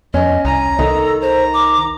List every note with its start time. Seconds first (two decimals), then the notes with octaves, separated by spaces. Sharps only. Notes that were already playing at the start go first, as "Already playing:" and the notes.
0.14 F2 C#4 D#5
0.45 C2 G#5 A#5
0.79 C2 D#3 A4
1.22 C5 A#5
1.53 D6